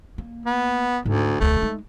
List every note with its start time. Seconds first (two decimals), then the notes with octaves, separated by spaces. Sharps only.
0.18 A#3
0.46 B3
1.05 D2 G#2
1.40 E1 D2 A3
1.62 G#3 D#4